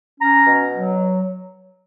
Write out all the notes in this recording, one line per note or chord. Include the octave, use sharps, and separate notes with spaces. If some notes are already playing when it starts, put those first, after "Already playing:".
C#4 A#5
B2
F#3